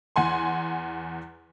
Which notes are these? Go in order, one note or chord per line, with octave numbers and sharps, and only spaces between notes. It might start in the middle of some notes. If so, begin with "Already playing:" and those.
E2 F#5 G#5 C6